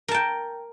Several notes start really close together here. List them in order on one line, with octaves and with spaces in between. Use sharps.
A#4 A5 G5